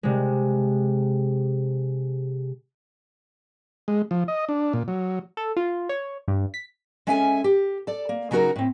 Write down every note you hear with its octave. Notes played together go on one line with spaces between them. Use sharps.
C3 G#3
G#3
F3
D#5
D4
A#2
F#3
A4
F4
C#5
G2
B6
G#3 C#4 A4 E5 F5 G#5
G4
A4 D5
A#3
C#3 F#3 D#4 F#4 A#4 A#5
A2 C4